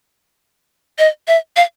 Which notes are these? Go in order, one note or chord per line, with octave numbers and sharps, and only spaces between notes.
D#5
E5
F5